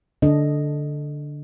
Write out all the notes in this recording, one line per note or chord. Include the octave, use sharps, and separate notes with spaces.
D3 D4 A4 D#5